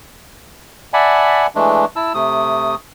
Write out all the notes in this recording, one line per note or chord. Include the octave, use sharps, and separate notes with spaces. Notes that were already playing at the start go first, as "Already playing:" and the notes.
D5 E5 F#5 G#5 A5 B5
E3 G#3 A3 D4
E4 A5 E6
C3 A3 D#6